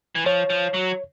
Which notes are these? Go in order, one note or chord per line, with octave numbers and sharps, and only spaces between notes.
E3
F3 C#5
F3
F#3